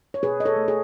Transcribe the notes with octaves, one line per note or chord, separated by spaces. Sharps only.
C#5
B2 G#4 B4
D#5
A4 C#5
A3
G#4